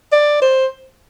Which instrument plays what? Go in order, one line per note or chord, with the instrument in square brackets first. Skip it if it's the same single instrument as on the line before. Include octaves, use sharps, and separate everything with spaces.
[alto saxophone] D5
C5